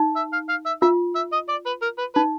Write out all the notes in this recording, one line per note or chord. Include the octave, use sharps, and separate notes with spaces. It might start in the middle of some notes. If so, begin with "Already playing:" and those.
Already playing: D#4
E5
F5
F5
E5
F4 E5
E5
D#5
D5
B4
A#4
B4
D#4 B4